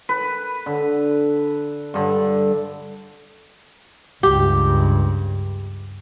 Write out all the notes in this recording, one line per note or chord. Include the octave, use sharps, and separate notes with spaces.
B4
D3
G2 D3
C#2 G2 G4